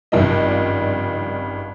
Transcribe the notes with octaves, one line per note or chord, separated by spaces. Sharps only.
G#1 G2 C#3 F3 D4 D#5